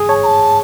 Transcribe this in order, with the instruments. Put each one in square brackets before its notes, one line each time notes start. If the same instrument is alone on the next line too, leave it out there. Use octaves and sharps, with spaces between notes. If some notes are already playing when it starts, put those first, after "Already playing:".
Already playing: [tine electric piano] G#4
[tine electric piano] C#5 [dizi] A5
[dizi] A#5
A5